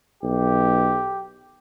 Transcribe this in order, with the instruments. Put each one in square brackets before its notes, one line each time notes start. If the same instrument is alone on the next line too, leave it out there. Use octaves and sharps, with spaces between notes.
[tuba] B1 [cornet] G4